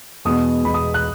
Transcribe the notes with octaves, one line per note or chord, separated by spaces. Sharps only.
E2 B2 G#3 B3 D#6
E2 B2 G#3 B3 B5
D#6
F#6